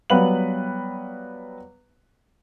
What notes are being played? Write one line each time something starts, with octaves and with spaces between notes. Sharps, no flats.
F#3 G3 B3 B4 F5 F#7